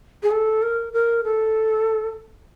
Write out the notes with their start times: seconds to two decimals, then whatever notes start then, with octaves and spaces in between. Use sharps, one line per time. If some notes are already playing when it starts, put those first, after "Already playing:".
0.23 G#4
0.31 A4
0.62 A#4
0.93 A#4
1.24 A4